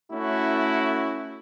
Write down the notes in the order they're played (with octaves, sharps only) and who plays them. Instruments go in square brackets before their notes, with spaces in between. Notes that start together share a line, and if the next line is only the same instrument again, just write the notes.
[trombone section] A3 C#4 E4 F#4